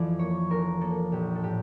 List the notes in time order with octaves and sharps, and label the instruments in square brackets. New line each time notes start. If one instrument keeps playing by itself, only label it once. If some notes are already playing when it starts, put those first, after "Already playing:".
Already playing: [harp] F2 E3 D5
A#3 C#5
F1 A#4
A#3 A4
A#1 G4
A4
A2 G4